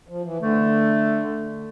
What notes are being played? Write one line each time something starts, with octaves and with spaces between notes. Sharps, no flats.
F3
E3
D3 A3